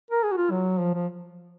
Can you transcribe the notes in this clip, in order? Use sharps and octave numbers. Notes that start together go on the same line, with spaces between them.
A#4
G#4
F#4
F4
F#3
F3
F3